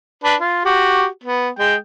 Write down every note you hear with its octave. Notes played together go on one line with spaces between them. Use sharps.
D4 B4
F4
F#4 G4
B3
G#3 G5